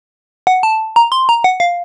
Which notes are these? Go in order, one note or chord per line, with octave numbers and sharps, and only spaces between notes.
F#5
A5
A#5
C6
A#5
F#5
F5